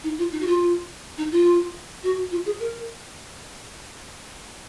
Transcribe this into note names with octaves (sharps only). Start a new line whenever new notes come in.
D#4
F4
D#4
F#4
F4
D#4
F4
F#4
F4
G#4
A#4